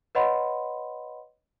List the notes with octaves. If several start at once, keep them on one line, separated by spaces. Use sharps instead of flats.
B4 C#5 D#5 F#5 B5 C6